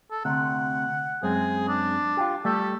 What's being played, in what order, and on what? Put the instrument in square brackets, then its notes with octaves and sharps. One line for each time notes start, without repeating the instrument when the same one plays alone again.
[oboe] A4
[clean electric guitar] D2 C3 [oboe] F#5
[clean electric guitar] F#2 G#3 C4 [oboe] G#4
[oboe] D4
[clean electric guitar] F4 G4
[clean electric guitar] G3 A3 G4 [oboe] A4